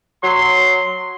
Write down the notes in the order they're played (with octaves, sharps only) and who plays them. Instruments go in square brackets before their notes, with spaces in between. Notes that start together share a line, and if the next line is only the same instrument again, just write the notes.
[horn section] F#3 C6